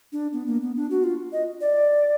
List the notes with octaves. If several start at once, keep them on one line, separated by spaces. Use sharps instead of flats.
D4
B3
A#3
B3
D4
F#4
F4
D#5
D5